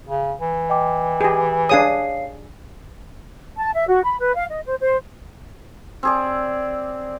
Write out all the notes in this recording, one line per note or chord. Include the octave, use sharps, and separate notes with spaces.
C#3
E3
D#5 G5 D6
G4 G#4
D4 G#4 C#5 F5 D#6 C7
A5
E5
F#4
B5
B4
F5
D#5
C5
C5
C4 G#4 D5